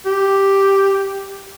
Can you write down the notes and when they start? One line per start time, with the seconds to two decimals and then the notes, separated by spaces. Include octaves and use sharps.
0.06 G4